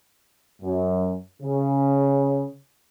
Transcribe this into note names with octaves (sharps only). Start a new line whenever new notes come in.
F#2
C#3